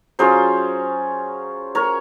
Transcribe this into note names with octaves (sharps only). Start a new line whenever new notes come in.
F#3 C#4 F4 G#4 C5
A#4 C#5